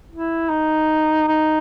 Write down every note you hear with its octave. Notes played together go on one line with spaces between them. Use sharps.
E4
D#4
D#4